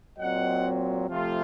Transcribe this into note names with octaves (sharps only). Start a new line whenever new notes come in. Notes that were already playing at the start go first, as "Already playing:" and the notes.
A#2 F#3 C4 D#5 F#5
C3 F3 A3 F4